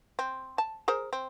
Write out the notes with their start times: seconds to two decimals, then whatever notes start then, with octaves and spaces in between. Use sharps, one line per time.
0.19 C4
0.58 A5
0.88 G#4 A#4 C5
1.13 C4